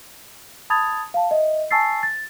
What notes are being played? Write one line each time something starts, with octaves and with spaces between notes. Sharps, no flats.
A5 B5 D#6 G#6 A6 F7
F5 A5
D#5 E5
G#5 A5 C#6 E6 A6 C7
A6